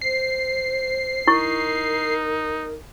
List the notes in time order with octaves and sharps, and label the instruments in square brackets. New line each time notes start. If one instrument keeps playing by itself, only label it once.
[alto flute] C5 [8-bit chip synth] C7
[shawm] D#4 [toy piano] E4 C#6 [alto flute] A#4